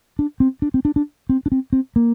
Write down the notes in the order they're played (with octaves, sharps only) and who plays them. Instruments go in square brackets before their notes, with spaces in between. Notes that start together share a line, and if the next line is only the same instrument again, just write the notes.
[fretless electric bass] D4
C4
D4
C4
D4
D4
C4
D4
C4
C4
A#3